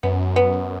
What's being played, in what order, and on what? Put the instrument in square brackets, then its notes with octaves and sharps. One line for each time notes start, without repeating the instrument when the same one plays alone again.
[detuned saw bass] F#2 [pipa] B3
[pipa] B3